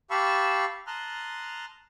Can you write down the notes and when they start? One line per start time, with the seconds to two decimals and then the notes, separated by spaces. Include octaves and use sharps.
0.11 G4 F5 A5 B5 C#6 E6
0.87 A5 A#5 C6 D#6 F6 F#6